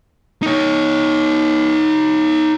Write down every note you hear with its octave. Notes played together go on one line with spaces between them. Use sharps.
D#4 C#5